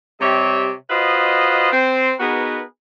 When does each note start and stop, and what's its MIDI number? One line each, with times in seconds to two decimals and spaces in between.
0.21 0.72 48
0.21 0.72 55
0.21 0.72 67
0.21 0.72 73
0.21 0.72 75
0.21 0.72 76
0.90 1.72 65
0.90 1.72 66
0.90 1.72 71
0.90 1.72 72
0.90 1.72 75
1.72 2.12 60
1.72 2.12 72
2.20 2.62 59
2.20 2.62 63
2.20 2.62 66
2.20 2.62 68
2.20 2.62 70
2.20 2.62 71